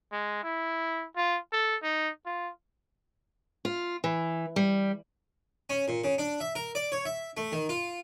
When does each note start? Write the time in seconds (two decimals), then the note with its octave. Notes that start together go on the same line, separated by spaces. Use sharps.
0.12 G#3
0.44 E4
1.17 F4
1.53 A4
1.83 D#4
2.26 F4
3.65 F4
4.04 E3
4.56 G3
5.70 C#4
5.88 A#2
6.04 C#3
6.18 D4
6.40 E5
6.55 A#4
6.75 D5
6.92 C#5
7.05 E5
7.37 A3
7.52 D#3
7.69 F4